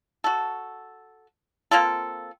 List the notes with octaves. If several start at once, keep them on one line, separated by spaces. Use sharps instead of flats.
F#4 A4
A#3 C4 F4 A4